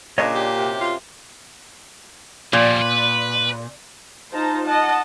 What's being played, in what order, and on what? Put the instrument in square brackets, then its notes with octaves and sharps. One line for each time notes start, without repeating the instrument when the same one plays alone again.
[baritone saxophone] A#2 [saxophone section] C#3 D4 [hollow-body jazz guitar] C#5 D#5
[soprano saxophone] G4
[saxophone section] F#2 C3
[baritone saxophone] F4
[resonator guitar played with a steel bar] A#2 [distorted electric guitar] F3 G3
[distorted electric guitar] B4
[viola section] D#4 F4 C5 A5 A#5
D#5 F#5 A5